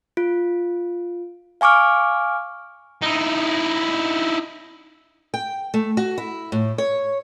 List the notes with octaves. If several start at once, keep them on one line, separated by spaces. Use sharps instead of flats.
F4
F5 G#5 C#6 D6 F6
D#4 E4
G5
A3
F#4
E4
A2
C#5